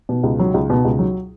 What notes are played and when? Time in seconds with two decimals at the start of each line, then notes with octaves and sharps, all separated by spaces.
0.09 B2
0.23 C#2
0.39 F#3
0.54 C#2
0.70 B2
0.85 C#2
0.99 F#3